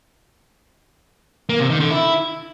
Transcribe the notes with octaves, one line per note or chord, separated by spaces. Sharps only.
A#3
C3
D#3
D3
E4